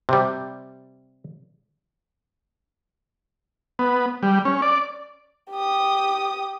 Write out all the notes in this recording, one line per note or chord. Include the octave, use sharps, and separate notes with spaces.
C3 G3
B3
G3
C#4
D5
G4 D#6